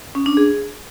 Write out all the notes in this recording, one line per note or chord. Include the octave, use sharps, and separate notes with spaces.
C#4
D4
G#4